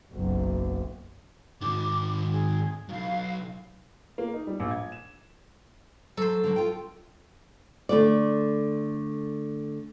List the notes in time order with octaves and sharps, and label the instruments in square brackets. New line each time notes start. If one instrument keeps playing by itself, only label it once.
[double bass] F#1 B1
[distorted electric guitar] G#2 D#3 [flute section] D6
[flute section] G#4
[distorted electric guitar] B1 F#2 [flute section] F5
[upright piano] A#3
D#4
G3
A#1
G#6
E7
[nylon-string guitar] F#3 [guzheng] A4 C5
[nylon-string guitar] D3 F#3
F4 G5
D3 A3 D5